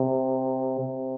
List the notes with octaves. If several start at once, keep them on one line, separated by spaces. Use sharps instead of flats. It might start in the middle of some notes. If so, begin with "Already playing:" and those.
Already playing: C3
C3